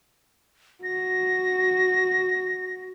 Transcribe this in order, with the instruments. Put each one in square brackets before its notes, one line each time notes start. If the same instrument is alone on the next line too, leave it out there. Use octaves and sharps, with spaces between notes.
[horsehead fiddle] F#4 [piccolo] A#6